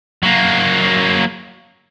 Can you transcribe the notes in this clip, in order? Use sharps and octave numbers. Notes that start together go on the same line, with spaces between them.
F#3 A#3